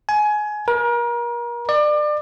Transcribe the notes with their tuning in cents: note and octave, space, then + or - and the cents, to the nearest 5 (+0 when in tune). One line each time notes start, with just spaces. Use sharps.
G#5 +20
A#4 +35
D5 +30